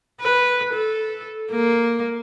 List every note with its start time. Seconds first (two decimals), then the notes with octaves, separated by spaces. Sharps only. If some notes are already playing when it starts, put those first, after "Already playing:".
0.21 B4
0.73 A4
1.51 A#3